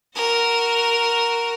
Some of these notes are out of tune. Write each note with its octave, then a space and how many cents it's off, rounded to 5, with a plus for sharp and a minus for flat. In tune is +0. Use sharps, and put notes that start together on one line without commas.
F#4 +0 A#4 +0